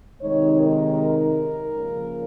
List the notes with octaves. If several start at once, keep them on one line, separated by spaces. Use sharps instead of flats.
C3 D#3 G#3 D#4 C#5
A#4
C#3 F3 A#3